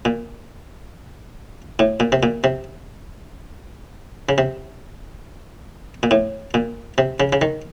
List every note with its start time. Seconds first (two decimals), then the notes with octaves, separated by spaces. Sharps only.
0.05 A#2
1.79 A2
2.00 A#2
2.12 C3
2.23 A#2
2.44 C3
4.29 C#3
4.38 C3
6.03 A#2
6.11 A2
6.54 A#2
6.98 C3
7.20 C#3
7.33 C#3
7.41 D#3